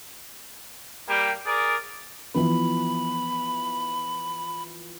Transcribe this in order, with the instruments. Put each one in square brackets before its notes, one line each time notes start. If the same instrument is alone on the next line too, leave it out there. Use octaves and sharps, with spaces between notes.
[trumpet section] G3 A#3 G4 G5
G#4 A#4 D5
[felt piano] E3 F3 B3 [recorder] B5